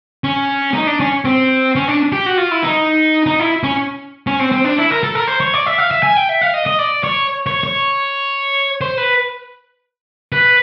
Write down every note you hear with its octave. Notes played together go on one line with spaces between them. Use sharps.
C#4
D#4
D4
C#4
C4
C#4
D4
G4
F#4
F4
E4
D#4
D#4
E4
C#4
C#4
C4
C4
D4
E4
A#4
A4
A#4
C5
C#5
D5
E5
F5
E5
G#5
G5
E5
F5
D#5
D#5
D5
C#5
C#5
C#5
C5
B4
B4